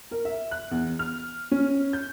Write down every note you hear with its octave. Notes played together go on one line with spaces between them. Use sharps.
A#4
E5
F#6
E2
F6
C#4
G6